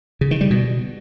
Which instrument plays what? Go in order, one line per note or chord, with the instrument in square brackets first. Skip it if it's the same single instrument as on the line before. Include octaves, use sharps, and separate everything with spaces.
[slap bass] C#3
D#3
G3
B2